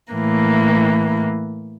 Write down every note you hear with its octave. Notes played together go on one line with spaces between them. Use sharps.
A2 E3 A#3